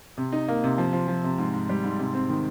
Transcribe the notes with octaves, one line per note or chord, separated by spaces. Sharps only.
C3
D#4
A#3
C3
F3
F3
F3
C3
G#2
G#2
G3
G#2
C3
C4
D#3